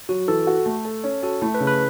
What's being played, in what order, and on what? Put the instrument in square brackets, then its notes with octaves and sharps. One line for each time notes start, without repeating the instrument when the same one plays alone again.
[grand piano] F#3 [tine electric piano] F#4
[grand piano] E3 [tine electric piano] A4
[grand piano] F#4
A3
A4
C#4
[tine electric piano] F#4 [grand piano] A4
[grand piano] A3 [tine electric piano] E4
[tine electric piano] B4
[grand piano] C#3
[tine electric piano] B4